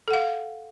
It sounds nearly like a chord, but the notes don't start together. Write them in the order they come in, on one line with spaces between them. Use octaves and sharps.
A4 F#5 F5